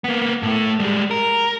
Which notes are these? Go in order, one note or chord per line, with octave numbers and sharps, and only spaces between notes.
A#3 B3
A2 A3
G3 G#3
A#4